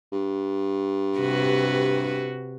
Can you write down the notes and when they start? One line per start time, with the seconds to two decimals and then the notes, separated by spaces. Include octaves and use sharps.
0.12 G2
1.19 C3 F#4 B4